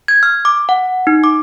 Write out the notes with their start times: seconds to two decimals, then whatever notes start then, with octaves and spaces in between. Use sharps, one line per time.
0.08 G#6
0.23 F6
0.45 D6
0.69 F#5
1.07 D#4
1.24 D6